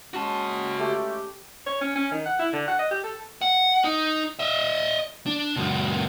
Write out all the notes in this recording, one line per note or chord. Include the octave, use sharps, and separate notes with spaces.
G#3 C#4 F#4 A5
A3 G4
C#5
C#4
C#4
D#3
F#5
E4
D3
F#5
D#5
G4
A4
F#5
D#4
D#5 E5
D4
C#2 F#2